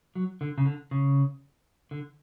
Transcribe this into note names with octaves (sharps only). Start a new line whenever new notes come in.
F#3
D3
C#3
D3
C#3
D3